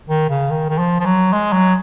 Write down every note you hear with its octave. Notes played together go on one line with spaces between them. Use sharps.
D#3
C#3
D#3
D#3
F3
F3
F#3
G#3
F#3